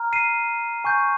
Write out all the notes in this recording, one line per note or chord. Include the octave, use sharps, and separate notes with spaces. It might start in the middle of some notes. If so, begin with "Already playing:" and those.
Already playing: A#5 F6
C7 D#7
G#5 C#6 G6